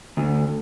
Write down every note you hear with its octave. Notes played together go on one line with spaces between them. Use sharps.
D2